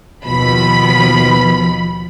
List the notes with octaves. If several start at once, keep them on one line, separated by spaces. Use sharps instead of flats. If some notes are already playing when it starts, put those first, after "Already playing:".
D#2 B2 F3 B5